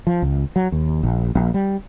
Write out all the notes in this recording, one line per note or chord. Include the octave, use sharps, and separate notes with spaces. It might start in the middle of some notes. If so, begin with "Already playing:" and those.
F3
C#2
F#3
D#2
A#1
A#1
G3